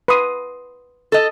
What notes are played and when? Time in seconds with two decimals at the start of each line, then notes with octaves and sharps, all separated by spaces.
0.08 B4 C6 D#6
1.12 A4 D#5